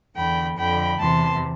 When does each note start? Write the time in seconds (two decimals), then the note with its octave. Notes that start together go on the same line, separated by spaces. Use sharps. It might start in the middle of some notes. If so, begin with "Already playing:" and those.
0.16 E2 D3 G5 B5
0.57 F2 D3 G5 B5
0.99 E2 C3 E3 A5 C6